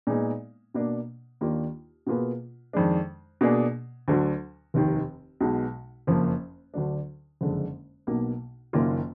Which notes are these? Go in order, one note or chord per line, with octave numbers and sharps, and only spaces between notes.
A#2 G#3 B3 D#4 G#4
B2 A#3 D4
D#2 D#3 A#3 D4 F4
B2 A#3 F4 G#4 B4
F2 D#3 G#3 D4
B2 A#3 D4 G#4
D2 D3 F#3
F1 D#2 D#3
B1 B2 G#3
F#1 F2 F3 A#3
D2 D3 F#3 D4
F#1 F2 D3 G#3
B1 B2 A#3
F#1 F#2 D#3 A#3 F4